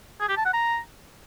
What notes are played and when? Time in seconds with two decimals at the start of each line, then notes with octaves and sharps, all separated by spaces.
0.20 G#4
0.29 G4
0.37 A5
0.45 F#5
0.53 A#5